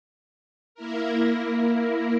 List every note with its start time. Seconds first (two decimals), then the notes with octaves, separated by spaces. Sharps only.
0.75 A#3 E4 A#4